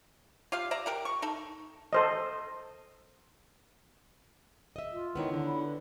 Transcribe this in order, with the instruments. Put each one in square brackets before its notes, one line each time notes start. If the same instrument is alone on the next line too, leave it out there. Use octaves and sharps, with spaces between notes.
[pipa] F4 G4 F5
D5 E5 A#5
G4 A#4 F#5
C#6
D#4 A4
[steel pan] A4 C5 D#5
[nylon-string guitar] D#5 E5
[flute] F4
[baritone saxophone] D#3 [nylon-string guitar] B3 E4 C#5
[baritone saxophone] D3
[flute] B5
B4